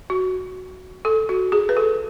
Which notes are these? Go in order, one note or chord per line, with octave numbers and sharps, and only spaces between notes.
F#4
A4
F#4
G#4
B4
A4